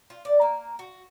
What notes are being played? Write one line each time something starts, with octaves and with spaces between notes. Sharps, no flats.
F4
D5
A#3
F#4